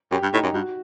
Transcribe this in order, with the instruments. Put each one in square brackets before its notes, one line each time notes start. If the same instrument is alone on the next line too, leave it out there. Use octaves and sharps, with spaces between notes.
[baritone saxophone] F#2 [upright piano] G4
[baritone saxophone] G2
[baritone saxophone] A2 [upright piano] D#4
[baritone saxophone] F#2
[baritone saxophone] G2 [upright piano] F#4